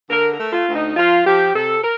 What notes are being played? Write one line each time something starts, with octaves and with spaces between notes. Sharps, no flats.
D3 A#4
A#4
A3
F4
D2
D#4
F3 F4
F3 G4
C3 A4
A#4